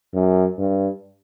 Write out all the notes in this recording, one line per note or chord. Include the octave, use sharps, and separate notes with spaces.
F#2
G2